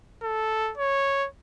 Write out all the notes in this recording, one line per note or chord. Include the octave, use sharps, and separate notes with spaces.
A4
C#5